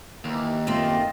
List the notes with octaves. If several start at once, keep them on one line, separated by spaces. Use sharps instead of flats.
D#2 E3
F#2 A3 C4 F4 D#5